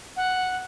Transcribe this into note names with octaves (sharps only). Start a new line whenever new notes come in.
F#5